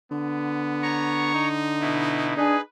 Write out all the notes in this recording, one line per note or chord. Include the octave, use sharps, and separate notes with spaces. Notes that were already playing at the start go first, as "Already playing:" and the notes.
D3 B3
C#5 A#5 C#6
D#4
B2 E4
D4 G#4 B4